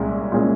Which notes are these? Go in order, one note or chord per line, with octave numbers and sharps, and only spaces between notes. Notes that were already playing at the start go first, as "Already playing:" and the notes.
Already playing: C2 A#2 G#3 C#4
A#2 G#3 C#4